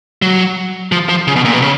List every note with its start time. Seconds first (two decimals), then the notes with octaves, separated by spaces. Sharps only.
0.22 F#3
0.92 F3
1.09 F3
1.27 C#3
1.36 B2
1.45 A#2
1.53 B2
1.62 C#3